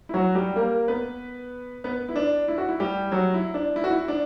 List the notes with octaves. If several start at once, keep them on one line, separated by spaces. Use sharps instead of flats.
E4
F#3 F#4
G3 G4
A#3 A#4
B3 B4
B3 B4
E4
D4
E4
F#4
E4
G3 G4
F#3 F#4
E4
D4
E4
F#4
E4
D4